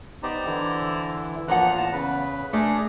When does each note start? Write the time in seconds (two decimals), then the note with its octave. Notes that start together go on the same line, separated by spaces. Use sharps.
0.23 B3 D#4 G4 C5 D5 A#5
0.46 D3 E3 E4
1.48 E2 F3 A#3 F4 F#5 A#5 F#6
1.77 A2 A5
1.93 C#3 B4
2.53 A3 D4 G#4 A#4 D6